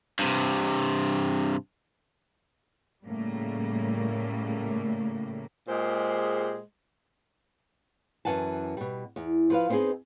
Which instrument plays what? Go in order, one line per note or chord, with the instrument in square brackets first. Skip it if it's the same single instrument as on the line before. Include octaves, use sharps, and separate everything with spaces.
[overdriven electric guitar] G2 C3
[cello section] A2 C#3 G3 A3 A#3
[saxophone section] A#2 G#3 G4 G#4 C5
[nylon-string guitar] F#2 E3 F#5 G#5 A5
B2 G3
E2
F3 B4 F5
B3 C4 D#4 G4 G#4 D#5